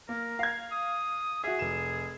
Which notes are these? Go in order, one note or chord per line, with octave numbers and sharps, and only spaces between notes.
A#3 A#4
F5 G#6
D#6
F#4 G#4 E5
F1 E7